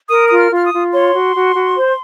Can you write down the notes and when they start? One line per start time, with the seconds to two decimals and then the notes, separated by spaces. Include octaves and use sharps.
0.09 A#4 D#6
0.29 F4 D#6
0.37 F6
0.51 F4 F6
0.64 D#6
0.72 F4
0.93 C#5 C6
1.14 F#4
1.35 F#4
1.55 F#4
1.76 C5